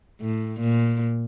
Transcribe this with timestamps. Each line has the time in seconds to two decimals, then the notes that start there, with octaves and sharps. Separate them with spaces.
0.21 A2
0.60 A#2